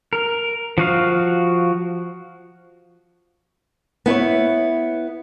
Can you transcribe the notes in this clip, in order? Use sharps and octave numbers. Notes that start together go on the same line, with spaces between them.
A#4
F3 F#4 F5
B3 E4 B4 C#5